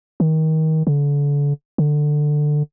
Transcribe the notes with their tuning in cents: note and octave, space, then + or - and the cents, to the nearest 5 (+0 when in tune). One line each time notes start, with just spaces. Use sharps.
D#3 +25
D3 -35
D3 +15